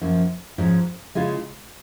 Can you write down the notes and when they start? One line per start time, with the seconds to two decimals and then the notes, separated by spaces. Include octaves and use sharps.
0.01 F#2 F3 A#3
0.58 G#2 F3 G#3 C#4
1.15 C#3 G#3 C#4 F4